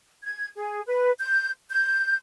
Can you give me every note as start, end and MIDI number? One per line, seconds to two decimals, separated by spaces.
0.23 0.48 92
0.56 0.81 68
0.86 1.11 71
1.19 1.50 91
1.70 2.16 91